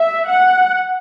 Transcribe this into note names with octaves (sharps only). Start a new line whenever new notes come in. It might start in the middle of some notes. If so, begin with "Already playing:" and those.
Already playing: E5
F#5